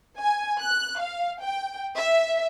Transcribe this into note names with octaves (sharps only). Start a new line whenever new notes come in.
G#5
F#6
F5
G5
E5